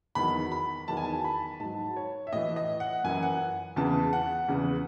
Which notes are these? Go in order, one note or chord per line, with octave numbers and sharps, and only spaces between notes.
E2 D#3 F#3 B5
B5
E2 D#3 F#3 A5
G#5
A5
B5
G#2 F#3 A5
C#5
E5
A2 E3 D#5
E5
D#5
F#5
F#2 E3 G#5
F#5
E2 C#3 E3 A5
F#5
E2 C#3 E3